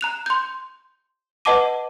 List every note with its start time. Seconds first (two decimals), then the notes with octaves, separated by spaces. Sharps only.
0.01 A#5 F#6 F7
0.26 C6 G6
1.45 B4 D#5 F#5 A5 D6 D#7